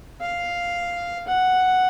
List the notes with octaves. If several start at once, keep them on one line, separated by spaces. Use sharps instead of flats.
F5
F#5